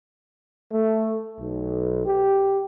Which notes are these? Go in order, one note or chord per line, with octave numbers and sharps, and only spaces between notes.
A3
B1
G4